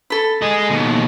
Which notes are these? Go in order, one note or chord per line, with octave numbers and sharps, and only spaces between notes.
A4 B5
G#4 D#5
D#2 B2